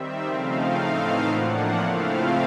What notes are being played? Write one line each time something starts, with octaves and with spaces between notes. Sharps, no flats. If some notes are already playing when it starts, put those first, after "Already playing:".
Already playing: D#3 G3 C4 E5
C#3 F3 A3 C4 D#4 F5
A2 E3 A3 C4 D#4 F5
A2 F3 A#3 D4 F#5
C#3 F3 A3 C4 E4 F5